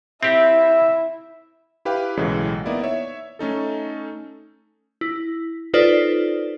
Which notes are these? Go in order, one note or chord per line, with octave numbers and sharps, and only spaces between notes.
C4 E4 G4 E5
E4 G4 B4 F5 G5
B1 A2 C#3 E3 F#3 G#3
A#3 B3 D#4 E4 D5
C#5 E5
A3 C#4 D#4 A4
E4
D#4 F4 A4 B4 C5 D5